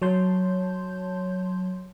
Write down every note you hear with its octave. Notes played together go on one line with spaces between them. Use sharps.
F#3 C#5 A5 C6 G6